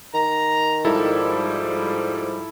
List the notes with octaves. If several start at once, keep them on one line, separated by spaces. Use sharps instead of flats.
D#3 A#5
G#2 F3 G3 E4 A4